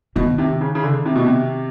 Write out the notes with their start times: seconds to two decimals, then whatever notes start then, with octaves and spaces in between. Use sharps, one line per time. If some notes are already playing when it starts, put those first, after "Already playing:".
0.16 B2 D#3
0.38 C3
0.61 C#3
0.75 C#3
0.83 D3
1.06 C3
1.16 B2
1.25 C3